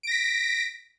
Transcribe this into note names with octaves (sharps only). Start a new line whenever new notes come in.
A#6 B6 D7